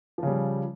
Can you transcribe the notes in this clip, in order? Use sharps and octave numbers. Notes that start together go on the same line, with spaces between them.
C#3 F3 G3